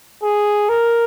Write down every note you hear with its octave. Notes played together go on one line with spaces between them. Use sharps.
G#4
A#4